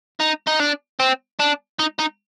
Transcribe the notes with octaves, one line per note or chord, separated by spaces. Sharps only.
D#4
D#4
D4
C4
D4
D#4
D#4